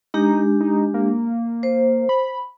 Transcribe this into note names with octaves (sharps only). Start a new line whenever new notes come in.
G#3 D4 D#4 G4
D#4
A#3
C5
B5